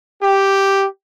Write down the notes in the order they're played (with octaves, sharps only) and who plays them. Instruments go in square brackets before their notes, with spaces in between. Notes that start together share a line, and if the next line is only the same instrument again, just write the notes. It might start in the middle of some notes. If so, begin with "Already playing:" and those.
[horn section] G4